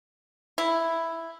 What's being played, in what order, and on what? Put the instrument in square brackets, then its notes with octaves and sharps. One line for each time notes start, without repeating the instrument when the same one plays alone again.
[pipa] E4